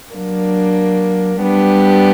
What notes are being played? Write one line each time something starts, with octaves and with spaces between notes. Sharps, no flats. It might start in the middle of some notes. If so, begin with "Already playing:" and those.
F#3 A#3 D4
G3 B3 D4 G4